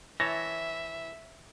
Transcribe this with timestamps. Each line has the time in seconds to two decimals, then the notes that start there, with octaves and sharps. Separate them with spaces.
0.20 E3 C#5 E5 A5 A#6